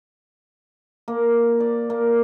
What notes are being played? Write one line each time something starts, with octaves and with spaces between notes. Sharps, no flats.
A#3
D5
A#3